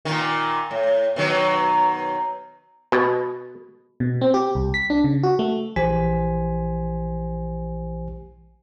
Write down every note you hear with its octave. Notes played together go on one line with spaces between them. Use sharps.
A#2 D#3
A2
B2 D#3 F#3
B2
B2
C4
G4
C2
B6
D4
C#3
F#4
A3
A#1 E3 G4 C5 G#5 B6